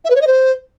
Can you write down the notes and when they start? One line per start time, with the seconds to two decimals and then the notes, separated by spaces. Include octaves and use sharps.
0.04 E5
0.10 B4
0.15 C#5
0.21 D#5
0.27 C5